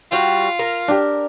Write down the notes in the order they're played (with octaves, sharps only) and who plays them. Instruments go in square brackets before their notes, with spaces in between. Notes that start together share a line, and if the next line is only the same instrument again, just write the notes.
[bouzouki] G3 F#4 [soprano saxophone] F4
[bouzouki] A#4
[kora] D4 G4